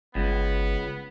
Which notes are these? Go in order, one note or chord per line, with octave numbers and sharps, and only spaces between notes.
G1 C#2 B3